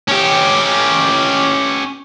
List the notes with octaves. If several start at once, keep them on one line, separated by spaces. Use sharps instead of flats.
C#4 G4